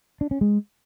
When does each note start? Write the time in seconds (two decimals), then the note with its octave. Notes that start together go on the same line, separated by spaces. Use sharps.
0.21 D4
0.31 C#4
0.41 G#3